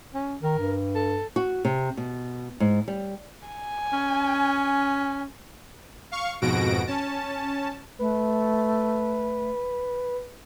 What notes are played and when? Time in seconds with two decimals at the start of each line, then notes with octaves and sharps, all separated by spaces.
0.14 C#4
0.43 D#3 A#4
0.59 G2
0.95 A4
1.36 F#4
1.65 C3
1.97 B2
2.60 G#2
2.88 G3
3.48 G#5
3.93 C#4
6.12 F5 C#6
6.42 F2 G#2 B2 F#4 A#6 D7
6.87 C#4 A5
7.99 A3 B4